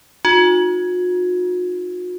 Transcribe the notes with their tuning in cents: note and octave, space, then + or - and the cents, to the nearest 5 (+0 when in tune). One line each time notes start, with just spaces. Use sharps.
D#4 +0 F#4 -45